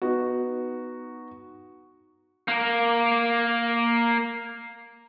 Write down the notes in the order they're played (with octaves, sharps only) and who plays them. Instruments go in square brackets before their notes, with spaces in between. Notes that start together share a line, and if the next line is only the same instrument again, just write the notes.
[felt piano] B3 D#4 F#4
[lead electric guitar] A#3 A#4